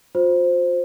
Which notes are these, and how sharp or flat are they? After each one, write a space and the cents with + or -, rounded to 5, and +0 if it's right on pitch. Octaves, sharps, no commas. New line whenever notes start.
F4 +40 C5 +0